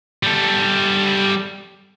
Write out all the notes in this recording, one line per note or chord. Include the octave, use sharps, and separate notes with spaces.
G3 A4